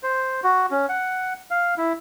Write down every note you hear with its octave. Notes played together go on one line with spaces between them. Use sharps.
C5
F#4
C#4
F#5
F5
E4